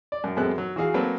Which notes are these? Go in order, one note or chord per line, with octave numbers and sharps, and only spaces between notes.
D5
F#2
F#2 G#3 B3 C4 A4 F#6
F#3
E3 F#4 G#4 F5
F#3 A3 A#3 C4 A4 B4